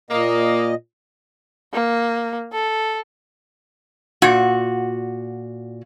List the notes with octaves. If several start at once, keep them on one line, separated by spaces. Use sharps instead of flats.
A#2 A#3 D#5
A#3
A4
A#2 F#4